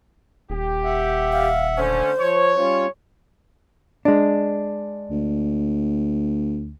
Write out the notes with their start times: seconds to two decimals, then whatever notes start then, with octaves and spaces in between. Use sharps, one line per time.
0.50 D#1 G4
0.84 E5 F#5
1.32 F5
1.77 D3 A3 C#4 C5
2.18 F3 C#5
2.56 G3 C#4 F4
4.05 G#3 D4
5.11 D2